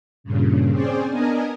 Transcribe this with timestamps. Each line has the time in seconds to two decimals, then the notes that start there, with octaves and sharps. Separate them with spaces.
0.24 G2 A#2 C#3
0.71 C4 C#4 G#4 C5 D5
1.09 B3 D4 A#4 D#5 G#5